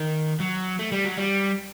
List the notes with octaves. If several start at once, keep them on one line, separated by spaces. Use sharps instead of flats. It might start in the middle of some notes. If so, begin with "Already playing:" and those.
Already playing: D#3
F#3
A3
G3
F#3
G3